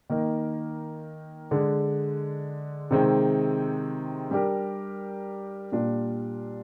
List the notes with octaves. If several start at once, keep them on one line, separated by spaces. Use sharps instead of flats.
D#3 A#3 D#4 A#4
D3 G#3 D4
C3 D#3 G#3 C4
G3 D4 G4 A#4
A#2 G3 D4 F4